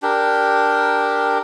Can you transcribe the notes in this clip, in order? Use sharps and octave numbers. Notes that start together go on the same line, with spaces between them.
D4 G4 A#4